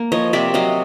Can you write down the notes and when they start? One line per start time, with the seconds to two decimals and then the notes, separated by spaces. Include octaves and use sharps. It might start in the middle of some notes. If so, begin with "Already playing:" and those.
Already playing: A#3
0.12 F3 C#5 D#5
0.33 C3 D5 E5
0.54 F#3 D#5 F5